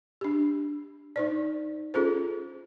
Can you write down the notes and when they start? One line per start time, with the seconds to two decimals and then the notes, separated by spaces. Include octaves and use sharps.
0.21 D4 G4
1.16 D#4 C5 D5
1.94 C#4 F4 G#4 A4 C5